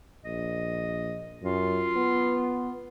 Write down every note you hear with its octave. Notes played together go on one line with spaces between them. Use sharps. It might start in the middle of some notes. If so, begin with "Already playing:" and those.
A#1 D#5
F#2 F4
B3